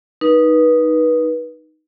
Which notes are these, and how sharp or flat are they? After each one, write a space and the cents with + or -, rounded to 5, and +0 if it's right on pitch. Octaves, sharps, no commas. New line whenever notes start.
D#4 +0 B4 -25